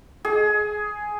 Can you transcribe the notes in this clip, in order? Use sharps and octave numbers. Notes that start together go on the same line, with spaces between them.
G#4